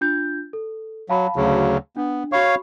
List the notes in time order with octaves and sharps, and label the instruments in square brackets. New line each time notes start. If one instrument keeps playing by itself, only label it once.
[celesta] D4 F4 G6
A4
[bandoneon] F#3 [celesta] F5 A5 B5
[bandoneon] D2 C#3 F#3
[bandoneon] B3 [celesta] D4
[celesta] F#4 B5 C#6 [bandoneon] C#5 F5